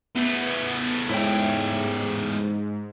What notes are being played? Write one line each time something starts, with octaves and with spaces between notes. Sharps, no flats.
E2 A3 B3
G#2 E4 C#5 G5